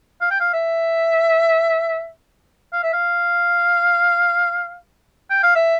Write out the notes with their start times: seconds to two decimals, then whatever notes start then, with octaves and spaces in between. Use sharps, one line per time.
0.21 F5
0.31 G5
0.40 F5
0.53 E5
2.73 F5
2.83 E5
2.93 F5
5.30 G5
5.43 F5
5.55 E5